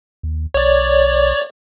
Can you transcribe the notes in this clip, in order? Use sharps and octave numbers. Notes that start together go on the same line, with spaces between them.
D#2
B1 C#5 D5